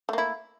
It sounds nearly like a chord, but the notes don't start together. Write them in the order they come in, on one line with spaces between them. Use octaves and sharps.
A3 A#3 E4